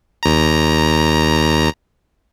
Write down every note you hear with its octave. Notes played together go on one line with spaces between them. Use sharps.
D#2 A#5